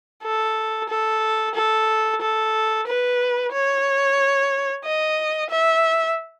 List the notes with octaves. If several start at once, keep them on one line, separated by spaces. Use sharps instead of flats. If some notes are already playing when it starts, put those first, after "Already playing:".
A4
A4
A4
A4
B4
C#5
D#5
E5